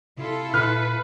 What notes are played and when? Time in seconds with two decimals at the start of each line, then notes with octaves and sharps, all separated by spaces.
0.18 C3 E4 F4 A4
0.54 A#2 B4 F6